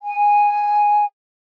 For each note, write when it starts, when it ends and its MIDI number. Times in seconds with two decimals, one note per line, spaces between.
0.02 1.04 80